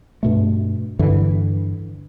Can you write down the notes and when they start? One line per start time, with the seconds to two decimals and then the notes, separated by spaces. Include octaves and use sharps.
0.23 G2 B2 A3
0.99 G2 D3 E3